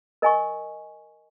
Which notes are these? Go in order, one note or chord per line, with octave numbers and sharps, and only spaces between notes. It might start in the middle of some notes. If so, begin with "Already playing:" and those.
A#4 D#5 G#5 C#6